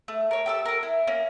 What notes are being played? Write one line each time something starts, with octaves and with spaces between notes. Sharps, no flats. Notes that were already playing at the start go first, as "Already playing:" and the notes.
A3
A#4 C#5
G4 A4 E6
A4 A#4
E4
A#3 C#4